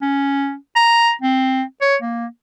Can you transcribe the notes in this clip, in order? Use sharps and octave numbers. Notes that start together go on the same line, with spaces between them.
C#4
A#5
C4
C#5
A#3